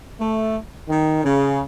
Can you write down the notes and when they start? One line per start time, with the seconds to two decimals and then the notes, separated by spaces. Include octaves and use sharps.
0.20 A3
0.89 D#3
1.24 C#3